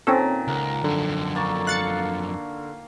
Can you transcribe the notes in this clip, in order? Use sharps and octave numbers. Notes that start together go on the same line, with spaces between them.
A#2 D#3 C4 C#4 A4
C#2 A#4 F#5
F#2 D3 F3
A#3 A5 C#6
F5 F#6 A6 C#7